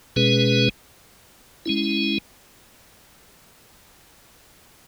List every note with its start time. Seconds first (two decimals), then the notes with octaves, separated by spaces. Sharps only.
0.16 B2 G#3 C#4 G#4 B4
1.66 G#3 C#4 E4